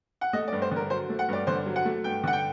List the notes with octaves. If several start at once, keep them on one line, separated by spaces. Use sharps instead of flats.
F#5
A3 D#5
D5
G2
C5
D3 A#4
F#3 C5
A3
F#5
G2 D5
D3 C5
F#3
F#5
A3
G2 G5
D3 F#5
G5